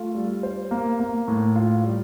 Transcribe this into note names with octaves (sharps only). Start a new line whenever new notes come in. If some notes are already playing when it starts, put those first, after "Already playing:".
Already playing: A3 F4
G3
C5
A#3
A#3
A2
F4
G3